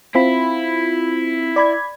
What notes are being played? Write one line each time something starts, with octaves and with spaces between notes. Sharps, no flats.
C4 E4 F4 B5
D5 B5 G#6